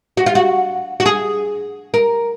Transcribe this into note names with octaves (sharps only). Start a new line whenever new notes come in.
F#4
F4
F#4
F#4
G#4
A#4